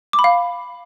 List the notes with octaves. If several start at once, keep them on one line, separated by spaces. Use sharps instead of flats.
D6
B5
F5